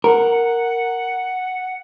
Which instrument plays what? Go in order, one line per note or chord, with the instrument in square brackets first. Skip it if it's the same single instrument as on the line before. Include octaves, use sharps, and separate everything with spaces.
[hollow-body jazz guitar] A#4 [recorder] F#5